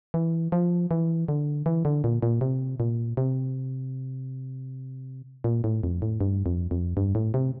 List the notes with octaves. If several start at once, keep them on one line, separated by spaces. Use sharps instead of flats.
E3
F3
E3
D3
E3
D3
A#2
A#2
C3
A#2
C3
A#2
A2
F2
A2
G2
F2
F2
G2
A2
C3